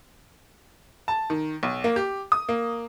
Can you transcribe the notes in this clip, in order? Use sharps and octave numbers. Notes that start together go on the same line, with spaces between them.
A5
D#3
B1
A#3
G4
D#6
A#3